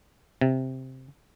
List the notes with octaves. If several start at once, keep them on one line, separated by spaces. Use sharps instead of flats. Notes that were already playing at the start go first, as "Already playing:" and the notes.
C3